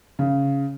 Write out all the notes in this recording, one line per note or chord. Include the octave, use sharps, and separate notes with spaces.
C#3